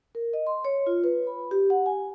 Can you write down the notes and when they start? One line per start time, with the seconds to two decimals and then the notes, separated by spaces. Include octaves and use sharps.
0.15 A#4
0.33 D#5
0.47 C6
0.65 C#5
0.87 F4
1.04 B4
1.27 B5
1.51 G4
1.70 F#5
1.86 G#5